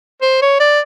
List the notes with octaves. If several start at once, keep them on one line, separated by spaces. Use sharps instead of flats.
C5
C#5
D5